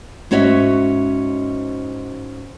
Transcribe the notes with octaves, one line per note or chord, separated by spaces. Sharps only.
G#2 C#4 F#4 C#5 E5